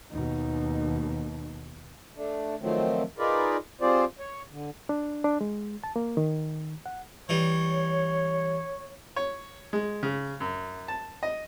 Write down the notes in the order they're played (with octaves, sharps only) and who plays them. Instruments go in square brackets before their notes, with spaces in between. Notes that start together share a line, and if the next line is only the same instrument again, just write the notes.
[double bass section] D#2 B2 [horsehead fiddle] D#4
[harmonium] A3 D4
D#3 F3 F#3 A3 C4
D#4 F4 G#4 A#4 B4 D5
G3 C4 F4 G#4 C5 D5
C#5
D3
[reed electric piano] D4
D4
G#3
A5
A#3
D#3
F#5
[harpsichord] E3 G3 [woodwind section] C#5
[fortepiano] C#5
G#3
C#3
F#2
A5
D#5